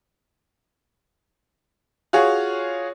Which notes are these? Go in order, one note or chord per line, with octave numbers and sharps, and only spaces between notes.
F4 F#4 G#4 C#5